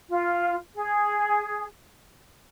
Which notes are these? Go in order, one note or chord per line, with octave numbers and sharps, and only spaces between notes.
F4
G#4